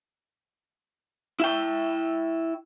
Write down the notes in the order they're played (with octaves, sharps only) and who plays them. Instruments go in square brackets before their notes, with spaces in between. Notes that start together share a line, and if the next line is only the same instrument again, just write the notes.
[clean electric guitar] E4 E5 G5